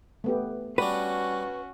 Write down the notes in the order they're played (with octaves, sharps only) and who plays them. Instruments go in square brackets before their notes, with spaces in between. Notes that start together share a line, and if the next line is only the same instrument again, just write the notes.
[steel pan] A3 B3 G4
[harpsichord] G3 D4 [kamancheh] C#4 F#4 [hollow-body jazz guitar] B4